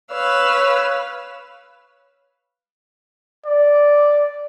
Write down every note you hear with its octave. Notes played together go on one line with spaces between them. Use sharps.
B4 C#5 F5 E6
D5